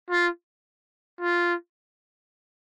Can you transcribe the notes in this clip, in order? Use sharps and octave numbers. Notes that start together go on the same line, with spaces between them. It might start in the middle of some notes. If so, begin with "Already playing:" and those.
F4
F4